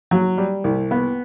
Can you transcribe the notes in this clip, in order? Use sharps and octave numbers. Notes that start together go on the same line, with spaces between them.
F#3
G3
C2
B3